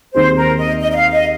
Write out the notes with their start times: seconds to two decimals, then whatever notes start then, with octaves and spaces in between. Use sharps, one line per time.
0.14 D#2 D#3 C4 D#4 G#4 C5
0.36 A#4
0.58 D#5
0.80 D#5
0.91 D#5
0.96 F5
1.13 D#5